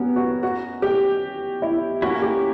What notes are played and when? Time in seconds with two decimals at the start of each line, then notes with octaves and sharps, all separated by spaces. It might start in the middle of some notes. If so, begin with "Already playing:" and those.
Already playing: B3 C#4 F#4 G4 A#4
0.16 F#4
0.43 F#4
0.82 G4
1.62 E4
2.02 A#3 C#4 E4 F#4
2.22 G4